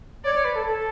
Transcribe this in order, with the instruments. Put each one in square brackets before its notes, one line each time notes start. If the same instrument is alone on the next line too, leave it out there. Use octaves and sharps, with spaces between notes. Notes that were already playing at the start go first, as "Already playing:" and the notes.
[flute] C#5 [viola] D5
[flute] C#5
B4
A4
A4